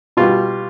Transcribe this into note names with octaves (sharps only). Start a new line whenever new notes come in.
B2 G3 F4